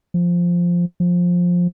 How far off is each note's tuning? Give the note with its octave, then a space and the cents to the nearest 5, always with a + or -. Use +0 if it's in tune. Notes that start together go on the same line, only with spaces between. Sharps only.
F3 +0
F3 +15